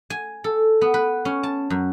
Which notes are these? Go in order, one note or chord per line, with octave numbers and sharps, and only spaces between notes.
G#5
A4
B3
B4
C#4
A5
F#2